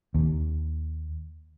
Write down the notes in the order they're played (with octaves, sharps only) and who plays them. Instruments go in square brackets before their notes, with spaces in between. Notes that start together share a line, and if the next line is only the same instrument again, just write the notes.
[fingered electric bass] D#2